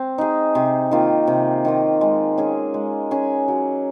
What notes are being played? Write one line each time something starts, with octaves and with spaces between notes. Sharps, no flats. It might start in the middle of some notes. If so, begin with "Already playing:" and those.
Already playing: C4
D#4 G#4
C3
D#3 A#3 F4
C3
D#3 A#3 F4
G#3
C#4 G#4
G#3
C#4 G#4
F#3